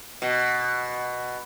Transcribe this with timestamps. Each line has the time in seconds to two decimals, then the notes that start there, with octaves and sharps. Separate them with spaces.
0.22 B2